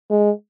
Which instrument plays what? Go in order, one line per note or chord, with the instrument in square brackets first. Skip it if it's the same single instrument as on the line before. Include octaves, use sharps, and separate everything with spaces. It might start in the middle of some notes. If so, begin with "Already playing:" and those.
[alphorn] G#3